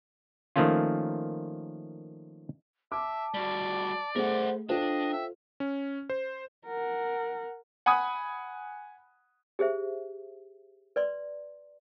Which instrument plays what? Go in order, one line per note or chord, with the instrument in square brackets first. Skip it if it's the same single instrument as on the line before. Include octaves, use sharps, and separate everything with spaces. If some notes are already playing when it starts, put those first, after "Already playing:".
[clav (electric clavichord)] D#3 F3 A3 A#3 C#4 F4
[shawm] E5 [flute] A5 [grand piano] D6
[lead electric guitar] G3 F#4 [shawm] D5
[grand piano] A3 G#4 [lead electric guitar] A#4 F#5 [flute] C5
[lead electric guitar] D4 [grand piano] F4 A4 C5 [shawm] D#5 [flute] G5
[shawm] E5
[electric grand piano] C#4
C5
[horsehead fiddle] A#4 F#5
[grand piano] F#5 G#5 B5 D#6 F#6
[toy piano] G4 G#4 C5 E5
B4 D5 C6